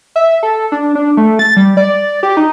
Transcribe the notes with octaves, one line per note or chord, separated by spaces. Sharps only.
E5
A4
D4
D4
A3
A6
G3
D5
G4
D#4